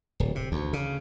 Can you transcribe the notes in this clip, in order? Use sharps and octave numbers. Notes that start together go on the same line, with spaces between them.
D1
C3
D2
C#3